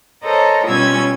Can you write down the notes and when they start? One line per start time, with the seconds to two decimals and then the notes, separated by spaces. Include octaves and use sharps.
0.24 A4 A#4 C5 C#5 D#5
0.67 B2 G3 C#4 F4 E6 G#6